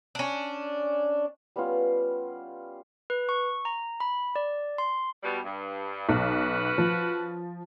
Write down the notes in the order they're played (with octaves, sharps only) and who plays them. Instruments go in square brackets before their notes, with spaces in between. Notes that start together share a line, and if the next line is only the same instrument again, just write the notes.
[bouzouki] C#4 D4
[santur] G3 B3 C#4 F4
[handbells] B4
C#6
A#5
B5
D5
C6
[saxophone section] B2 G3
G2
[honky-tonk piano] B1 [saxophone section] C#4 F#4 B4
[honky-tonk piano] F3